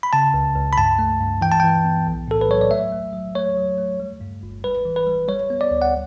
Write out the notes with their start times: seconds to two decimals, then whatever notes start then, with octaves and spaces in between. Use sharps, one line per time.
0.03 B5
0.13 C#3 A5
0.34 C#2
0.56 C#2
0.73 B5
0.78 G2 A5
0.99 A3
1.20 G2
1.41 E3 G5
1.52 A5
1.60 E3 G5
1.85 B3
2.07 B1
2.28 A2 A4
2.41 B4
2.49 F#3 C#5
2.61 D5
2.70 A3 E5
2.92 A3
3.13 F#3
3.35 A3 C#5
3.57 F#3
3.78 A3
4.00 G3
4.21 G2
4.43 G1
4.64 G3 B4
4.85 E3
4.96 B4
5.07 G3
5.28 G3 C#5
5.50 B3
5.61 D5
5.71 D2
5.82 F#5